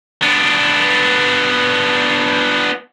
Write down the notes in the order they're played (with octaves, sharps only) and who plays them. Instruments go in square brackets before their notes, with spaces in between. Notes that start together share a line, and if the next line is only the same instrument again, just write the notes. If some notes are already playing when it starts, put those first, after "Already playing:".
[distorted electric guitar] B3 D4